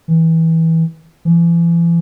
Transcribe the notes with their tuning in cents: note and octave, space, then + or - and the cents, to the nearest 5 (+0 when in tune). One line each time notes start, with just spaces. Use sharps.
E3 -20
E3 +40